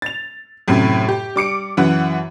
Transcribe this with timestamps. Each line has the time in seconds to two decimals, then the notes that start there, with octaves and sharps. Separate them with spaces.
0.02 A6 F7
0.68 F#2 A2 C3
1.08 G4
1.36 G3 D6 C#7 D7
1.77 F#2 E3 F#5